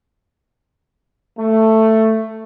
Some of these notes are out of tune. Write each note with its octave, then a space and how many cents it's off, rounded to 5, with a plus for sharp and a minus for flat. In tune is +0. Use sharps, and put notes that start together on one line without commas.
A3 +10